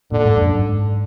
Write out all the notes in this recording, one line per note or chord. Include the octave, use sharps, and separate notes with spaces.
A#2 D3
G#2
F#2
G#2